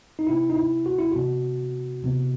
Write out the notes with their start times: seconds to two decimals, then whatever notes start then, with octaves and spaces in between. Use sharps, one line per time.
0.19 D#4
0.27 C3 E3 B3 E4
0.50 D#4
0.57 E4
0.86 F#4
0.98 E4
1.12 C3 E3 B3 F#4
2.04 C3 E3 B3